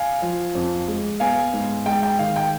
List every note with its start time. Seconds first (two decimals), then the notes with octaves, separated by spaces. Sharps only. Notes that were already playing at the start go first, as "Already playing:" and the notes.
Already playing: F5 G#5
0.22 F3
0.55 F2
0.88 G#3
1.20 B3 F5 G#5
1.54 G#2
1.86 G#3 G5
2.03 G5
2.19 D#3 F5
2.36 G5